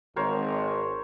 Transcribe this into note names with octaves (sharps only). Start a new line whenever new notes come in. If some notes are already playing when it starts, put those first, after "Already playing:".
G#1 A#4 C5 C#5